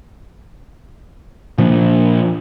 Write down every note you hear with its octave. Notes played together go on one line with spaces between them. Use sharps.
A#2 F3 A#3 D4